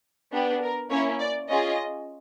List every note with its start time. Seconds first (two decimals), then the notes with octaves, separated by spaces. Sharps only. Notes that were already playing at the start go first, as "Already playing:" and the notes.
0.32 B3 D4 G4
0.61 A#4
0.90 A#3 C#4 E4 C#5
1.19 D5
1.49 C#4 F4 G#4 D#5